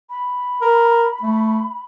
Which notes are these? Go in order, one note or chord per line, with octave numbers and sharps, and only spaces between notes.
B5
A#4
A3